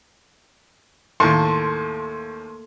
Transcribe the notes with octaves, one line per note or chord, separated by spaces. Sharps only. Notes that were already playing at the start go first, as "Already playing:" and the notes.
D#2 A2 A3 A#3 A5 C6